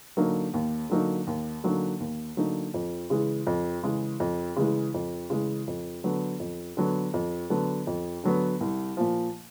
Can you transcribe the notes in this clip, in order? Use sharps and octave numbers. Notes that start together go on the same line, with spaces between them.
D3 F#3 A#3 D#4
D#2
D3 F#3 A#3 D#4
D#2
D3 F#3 A#3 D#4
D#2
D3 F#3 A#3 D#4
F2
C#3 E3 G#3
F2
C#3 E3 G#3
F2
C#3 E3 G#3
F2
C#3 E3 G#3
F2
D3 F#3 B3
F2
D3 F#3 B3
F2
D3 F#3 B3
F2
D3 F#3 B3
C2
A#2 F3